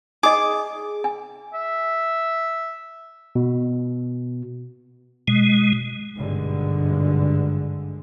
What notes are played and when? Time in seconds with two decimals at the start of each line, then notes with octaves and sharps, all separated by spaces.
0.23 D#4 G#4 D#5 D6
1.04 G#5
1.54 E5
3.35 B2
5.28 B2 G#3
6.16 G#1 G2 B2 D3 G#3